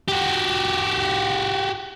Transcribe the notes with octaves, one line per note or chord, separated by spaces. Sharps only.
F#4 G4